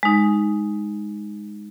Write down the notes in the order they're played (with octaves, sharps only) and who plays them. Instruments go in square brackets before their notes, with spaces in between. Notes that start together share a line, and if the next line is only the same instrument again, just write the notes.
[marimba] G#3 D#4